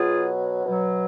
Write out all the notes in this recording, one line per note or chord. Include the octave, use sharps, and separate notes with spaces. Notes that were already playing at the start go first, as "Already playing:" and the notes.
Already playing: B2 F#3 F4 G#4
B2 F#3